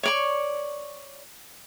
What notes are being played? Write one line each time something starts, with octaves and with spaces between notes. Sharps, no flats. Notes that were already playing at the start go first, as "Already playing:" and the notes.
C#5 D5 C#6